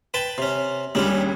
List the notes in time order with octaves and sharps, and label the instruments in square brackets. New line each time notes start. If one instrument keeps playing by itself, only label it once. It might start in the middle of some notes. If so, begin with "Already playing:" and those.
[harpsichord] B4 G5 A5
C3 C#4
[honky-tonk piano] D#2 C#3 [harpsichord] G3 C#4 D4